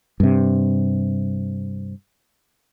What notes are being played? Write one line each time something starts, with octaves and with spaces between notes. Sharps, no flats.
G2 C3